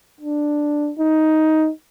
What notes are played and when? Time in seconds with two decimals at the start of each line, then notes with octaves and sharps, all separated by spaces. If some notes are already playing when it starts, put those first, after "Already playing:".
0.21 D4
0.99 D#4